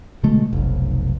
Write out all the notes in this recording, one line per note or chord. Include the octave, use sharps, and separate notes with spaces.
B2 D3 G#3 A3
F1 B1